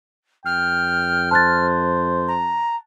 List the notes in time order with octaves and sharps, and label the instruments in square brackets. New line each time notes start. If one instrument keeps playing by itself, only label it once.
[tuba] F2 [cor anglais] G5 [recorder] F6
[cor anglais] C5 [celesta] A5 F#6 A6
[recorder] A#5